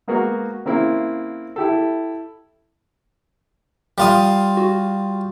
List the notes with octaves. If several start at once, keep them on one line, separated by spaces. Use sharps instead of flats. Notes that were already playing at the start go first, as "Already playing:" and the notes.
G#3 A#3 B3 F#4 A#4
C#3 A#3 C4 E4
E4 G4 A4
G3 F4 D#6
F#4